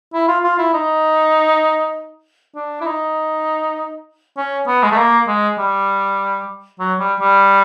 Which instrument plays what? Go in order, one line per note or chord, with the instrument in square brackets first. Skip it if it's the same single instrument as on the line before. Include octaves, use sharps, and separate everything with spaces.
[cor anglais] E4
F4
F4
E4
D#4
D4
E4
D#4
C#4
B3
G#3
A3
A#3
G#3
G3
F#3
G3
G3